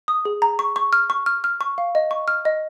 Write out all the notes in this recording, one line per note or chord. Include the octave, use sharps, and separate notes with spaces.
D#6
G#4
A#5
C#6
C#6
F6
C#6
F6
F6
C#6
F5
D#5
C#6
F6
D#5